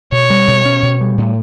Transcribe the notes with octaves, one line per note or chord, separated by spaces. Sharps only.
B2 C#5
G3
B2
C#4
B2
G3
A2